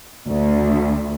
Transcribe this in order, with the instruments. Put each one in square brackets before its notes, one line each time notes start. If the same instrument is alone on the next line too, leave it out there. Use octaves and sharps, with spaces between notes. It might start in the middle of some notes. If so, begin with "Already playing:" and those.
[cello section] D2